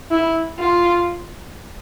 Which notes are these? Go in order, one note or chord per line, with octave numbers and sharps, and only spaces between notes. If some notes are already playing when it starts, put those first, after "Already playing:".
E4
F4